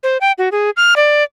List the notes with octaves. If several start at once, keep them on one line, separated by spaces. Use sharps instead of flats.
C5
G5
F#4
G#4
F6
D5